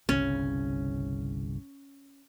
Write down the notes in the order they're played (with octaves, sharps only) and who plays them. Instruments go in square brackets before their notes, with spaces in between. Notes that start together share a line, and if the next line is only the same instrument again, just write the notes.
[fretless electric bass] G1 C2 C#3 [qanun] C#4